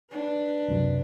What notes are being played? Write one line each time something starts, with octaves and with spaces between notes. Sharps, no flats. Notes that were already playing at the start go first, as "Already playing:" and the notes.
D4 B4
C#2 F#2 C3